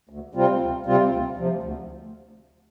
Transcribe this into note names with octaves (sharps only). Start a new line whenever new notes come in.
D2
C3 G3 C4 F4
D2
C3 G3 C4 F4
D2
C3 F3
D2